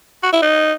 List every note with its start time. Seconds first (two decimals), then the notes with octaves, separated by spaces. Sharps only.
0.23 F#4
0.33 E4
0.42 D#4